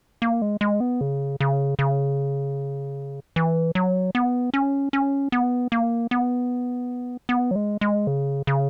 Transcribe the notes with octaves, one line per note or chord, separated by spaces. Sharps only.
A#3
G#3
G#3
B3
C#3
C#3
C#3
E3
F#3
B3
C#4
C#4
B3
A#3
B3
B3
F#3
G#3
G#3
C#3
C#3